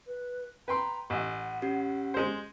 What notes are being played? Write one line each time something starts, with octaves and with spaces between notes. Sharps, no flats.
B4
B4 G5 A#5 C6
A1 D#5 F#5
C#4 F#4 G4
G#3 C5